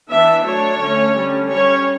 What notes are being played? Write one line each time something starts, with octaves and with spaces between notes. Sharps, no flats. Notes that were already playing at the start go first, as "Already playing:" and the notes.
E3 B3 D4 E5
F#3 A3 D4 C#5
D3 A3 C#4
D3 G3 C#4
G3 C#4 C#5